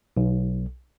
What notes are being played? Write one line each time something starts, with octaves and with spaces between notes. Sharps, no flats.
B1